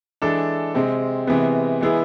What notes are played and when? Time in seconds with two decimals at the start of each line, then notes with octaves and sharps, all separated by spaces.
0.22 E3 G#3 D4 A4
0.75 C3 G#3 C4
1.27 C3 E3 G#3 B3
1.81 E3 G#3 B3 E4 G#4